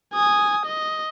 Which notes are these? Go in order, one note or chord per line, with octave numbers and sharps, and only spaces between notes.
G#5 D#6
D#5